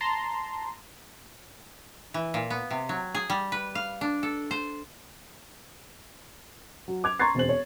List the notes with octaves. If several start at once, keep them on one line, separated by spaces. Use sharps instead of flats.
A5 A#5 C6
E3
A#2
B3
C3
F#3
G#4
G3
B4
F5
D4
A4
C5
F#3
D6 G#6 F7
A#5 C6 C#6 G#6 A6 C7
E1 C4 C5 F#7
C#5